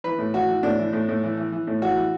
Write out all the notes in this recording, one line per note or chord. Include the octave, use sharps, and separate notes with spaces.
E3 B4
A2
E3 F#4
E3
A2 D4
E3
A2
A2
E3
E3
E3
A2
E3 F#4
E3